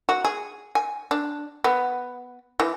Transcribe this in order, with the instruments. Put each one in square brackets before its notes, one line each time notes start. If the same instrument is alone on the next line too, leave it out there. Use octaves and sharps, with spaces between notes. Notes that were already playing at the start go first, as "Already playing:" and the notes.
[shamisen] F#4
G#4
G#5
D4
B3
E3